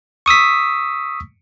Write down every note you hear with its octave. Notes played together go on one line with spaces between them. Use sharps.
C#6 D#6 E6 B6